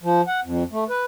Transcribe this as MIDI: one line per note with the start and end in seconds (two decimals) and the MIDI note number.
0.03 0.21 53
0.27 0.40 78
0.44 0.63 41
0.72 0.84 57
0.89 1.05 71